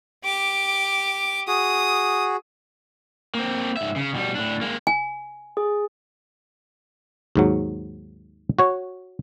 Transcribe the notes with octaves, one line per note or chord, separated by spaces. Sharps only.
G4 D6
F#4 G#4 D#6
A#3 C4
G#2 E5
C#3
B2 G3
A2 D4
G#3 A#3
G#5
G#4
D#2 G#2 F#3
F#4 C#5